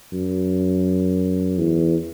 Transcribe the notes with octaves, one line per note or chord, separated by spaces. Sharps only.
F#2
E2